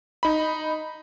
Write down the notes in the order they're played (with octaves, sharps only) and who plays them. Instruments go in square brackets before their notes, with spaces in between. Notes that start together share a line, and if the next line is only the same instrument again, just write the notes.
[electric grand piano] D#4 B5